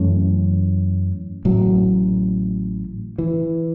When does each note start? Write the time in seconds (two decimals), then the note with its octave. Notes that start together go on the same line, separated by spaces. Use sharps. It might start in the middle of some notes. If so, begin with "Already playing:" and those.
Already playing: F#2 E3 A3 C#4
1.45 A1 A2 F#3
3.18 E3